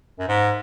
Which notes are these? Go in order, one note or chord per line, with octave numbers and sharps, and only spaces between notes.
F#2
G#2